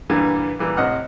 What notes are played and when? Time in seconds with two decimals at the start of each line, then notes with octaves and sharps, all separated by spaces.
0.10 G2 A#2 D3 E3 G3
0.59 A#2 E3 G3
0.77 A2 C3 D#5 F#5 F6